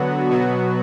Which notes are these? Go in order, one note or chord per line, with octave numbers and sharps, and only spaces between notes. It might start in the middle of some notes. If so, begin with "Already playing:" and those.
Already playing: D3 F#3 B3 F#4
B2 F#3 B3 F#4